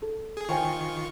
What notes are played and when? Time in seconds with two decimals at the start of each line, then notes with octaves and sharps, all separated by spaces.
0.02 A4
0.37 G#4
0.49 D#3 F4 C5 G5 G#5 C#6